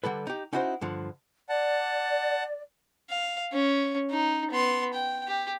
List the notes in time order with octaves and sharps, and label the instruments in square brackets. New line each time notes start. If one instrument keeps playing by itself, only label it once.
[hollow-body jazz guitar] D3 G3 A4 B4
D#4 G4
C#4 D#4 E4 F#4 B4 C5
G2 D3 F3
[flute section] D5 [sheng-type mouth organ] F#5 A5
[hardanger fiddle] F5
C#4
D#4
B3 C6
G5
G4